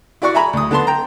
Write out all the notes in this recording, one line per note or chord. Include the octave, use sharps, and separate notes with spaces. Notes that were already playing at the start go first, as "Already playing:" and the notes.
E4 F#4 D5 F#5 C#6
E5 G#5 A#5 B5
D2 D#6
D3 B3 A5 C6
G5 A#5